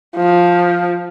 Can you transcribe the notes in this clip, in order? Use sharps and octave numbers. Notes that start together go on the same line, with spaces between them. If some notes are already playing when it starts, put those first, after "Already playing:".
F3